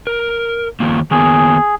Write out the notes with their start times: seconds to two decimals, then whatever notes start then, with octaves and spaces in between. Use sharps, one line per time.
0.07 A#4
0.80 D#3 F3 A#3
1.11 D#3 A#3 B3 G#4